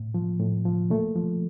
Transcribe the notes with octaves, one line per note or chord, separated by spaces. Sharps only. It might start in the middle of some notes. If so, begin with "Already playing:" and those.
Already playing: A2
F3
A2
F3
A#2 A3
F3